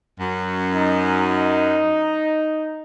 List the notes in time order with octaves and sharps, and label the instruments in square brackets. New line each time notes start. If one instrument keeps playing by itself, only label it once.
[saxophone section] F#2
[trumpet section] D#4